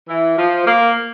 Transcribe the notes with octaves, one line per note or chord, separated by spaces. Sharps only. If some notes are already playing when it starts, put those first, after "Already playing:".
E3
F3
A#3